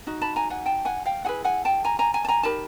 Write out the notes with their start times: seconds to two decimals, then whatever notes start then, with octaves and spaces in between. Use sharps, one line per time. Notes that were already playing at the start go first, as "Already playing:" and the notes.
0.07 D#4 F#4
0.21 A5 B5
0.36 G#5 A#5
0.50 F#5 G#5
0.66 G5 A5
0.85 F#5 G#5
1.06 F5 G5
1.24 E4 G#4 B4 F#5 G#5
1.44 F#5 G#5
1.65 G5 A5
1.84 G#5 A#5
1.99 G#5 A#5
2.14 G#5 A#5
2.25 A5
2.28 G#5 A#5
2.43 D#4 G4 A#4 A5 B5